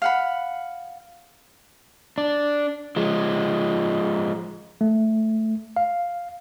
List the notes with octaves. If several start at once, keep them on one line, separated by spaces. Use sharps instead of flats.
F5 F#5 B5
D4
F3 G#3
A3
F5